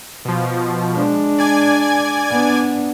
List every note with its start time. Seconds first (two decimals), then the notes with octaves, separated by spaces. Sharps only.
0.25 B2 F3
0.95 G#3 D4
1.39 D5 G#5 G#6
2.30 B3 D4